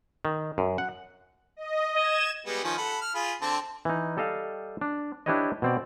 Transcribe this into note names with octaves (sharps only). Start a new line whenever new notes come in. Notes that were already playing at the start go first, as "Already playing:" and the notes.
D#3
F#2
F#5
D#5
D#5 G#6 E7
G3 G#3 B3
D#3 F3 C#4
A4 F#5 B5
F6
F4 G#4 B5
D3 C4 A5
E3 D#4
G3 A4 D#5 F5
D4
D4 E4 G4 B4 C#5 D#5
B2 C4 D5